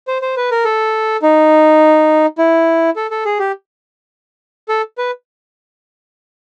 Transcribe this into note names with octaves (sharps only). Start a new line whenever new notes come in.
C5
C5
B4
A#4
A4
D#4
E4
A4
A4
G#4
G4
A4
B4